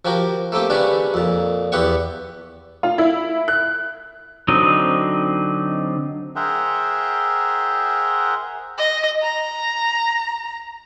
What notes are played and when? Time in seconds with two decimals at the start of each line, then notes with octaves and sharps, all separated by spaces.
0.05 F3 F#4 G4 A#4
0.52 A3 A#3 C4 G4
0.70 C#3 G3 B3 C#4 D4
1.14 F2 A#2
1.72 E2 B3 G4 F#5 C#6
2.83 F4
2.98 E4
3.48 F#6
4.48 D3 F#3 C4 D#4 D#5
6.36 G#4 A#4 C5 E5 F#5 G5
8.78 D#5
9.22 A#5